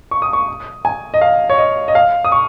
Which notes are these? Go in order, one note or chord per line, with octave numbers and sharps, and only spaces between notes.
C#6
D#6
C#6
G#5
D#5
F5
C#5
D#5
D#5
F5
D#6
C#6